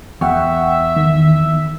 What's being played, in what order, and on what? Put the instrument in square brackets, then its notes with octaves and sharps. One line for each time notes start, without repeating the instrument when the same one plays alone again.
[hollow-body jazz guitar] E2 [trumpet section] E5 [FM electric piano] F#5 G5 C#6
[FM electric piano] D#3